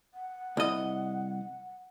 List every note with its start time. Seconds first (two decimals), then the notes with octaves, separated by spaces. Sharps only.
0.14 F#5
0.57 C2 D#5